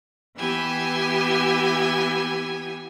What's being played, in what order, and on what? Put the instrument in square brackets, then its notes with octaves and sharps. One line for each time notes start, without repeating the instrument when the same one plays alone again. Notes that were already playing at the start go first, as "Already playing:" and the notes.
[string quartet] E3 B3 G4 G#5 E6